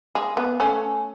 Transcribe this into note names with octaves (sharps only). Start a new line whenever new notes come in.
G#3
B3
A3 C#4